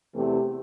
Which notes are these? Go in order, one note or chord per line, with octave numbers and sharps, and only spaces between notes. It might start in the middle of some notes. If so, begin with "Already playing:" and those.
E2 C3 E3 A3 C4 G4